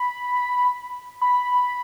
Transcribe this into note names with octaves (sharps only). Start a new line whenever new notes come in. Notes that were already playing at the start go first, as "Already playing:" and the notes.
Already playing: B5
B5